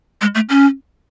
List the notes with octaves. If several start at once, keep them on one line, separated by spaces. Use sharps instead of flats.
G#3
A3
C#4